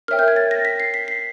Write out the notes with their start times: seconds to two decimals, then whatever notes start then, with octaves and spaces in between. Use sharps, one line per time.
0.08 A#4 C#5 E5 G5 F6
0.19 G6
0.28 G#6
0.36 A6
0.51 A#6
0.65 B6
0.80 C7
0.94 B6
1.08 C7